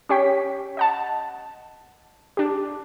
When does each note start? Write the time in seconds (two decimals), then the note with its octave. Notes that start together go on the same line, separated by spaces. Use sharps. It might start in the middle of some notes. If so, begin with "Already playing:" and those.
0.09 C#4 G4 C#5 G5 B6
0.77 D#5 F#5 A5
2.37 D4 G4